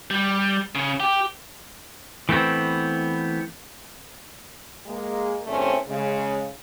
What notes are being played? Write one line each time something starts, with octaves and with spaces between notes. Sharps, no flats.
G3
C#3
G4
E3 A3 B3 C4
G#3 A#3
E2 G2 C3 A3 C4 C#4
C#3 G#3